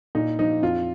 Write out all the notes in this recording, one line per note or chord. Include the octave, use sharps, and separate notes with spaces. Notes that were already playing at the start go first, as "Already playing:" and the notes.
A#2 D#4
F3 D#4
F2 F4